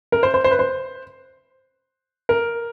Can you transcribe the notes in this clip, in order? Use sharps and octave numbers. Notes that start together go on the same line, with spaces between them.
A#4
C5
C5
C5
B4
C5
A#4